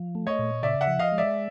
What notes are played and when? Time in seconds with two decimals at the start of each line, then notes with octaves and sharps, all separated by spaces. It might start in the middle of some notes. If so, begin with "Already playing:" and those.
Already playing: F3
0.15 A3
0.27 C#5 D#5
0.39 A#2
0.63 C#3 D5 E5
0.81 E5 F#5
0.87 F3
0.99 D#5 F5
1.12 G#3
1.18 D5 E5